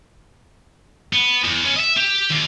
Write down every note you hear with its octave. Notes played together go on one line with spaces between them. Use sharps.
B3
E2
B3 C#4
D#5 E5
G4
D#2